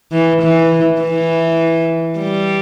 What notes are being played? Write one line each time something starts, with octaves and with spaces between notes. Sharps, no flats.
E3
E3
E3
G3